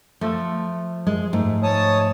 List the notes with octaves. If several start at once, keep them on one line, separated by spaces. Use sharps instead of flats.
F3 A3 A4
G#3
G#2 A3
C#5 A5 D#6